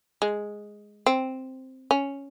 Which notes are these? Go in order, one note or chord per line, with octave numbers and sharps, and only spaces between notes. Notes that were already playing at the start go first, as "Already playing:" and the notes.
G#3
C4
C#4